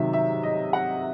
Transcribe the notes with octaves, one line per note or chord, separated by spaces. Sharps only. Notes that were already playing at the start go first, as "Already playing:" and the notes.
Already playing: C3 D#3 F#3 E5
E5
D#5
F#5